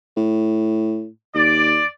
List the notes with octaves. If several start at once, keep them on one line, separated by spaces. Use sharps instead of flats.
A2
D#2 D5